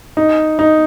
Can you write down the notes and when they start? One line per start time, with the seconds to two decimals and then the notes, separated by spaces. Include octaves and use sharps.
0.17 D#4
0.59 D#4